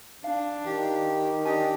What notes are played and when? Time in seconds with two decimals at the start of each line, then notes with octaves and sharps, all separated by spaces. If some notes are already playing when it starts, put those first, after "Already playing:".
0.24 D4 F5
0.66 D#3 G4
1.45 D4 G4 D#5 G#5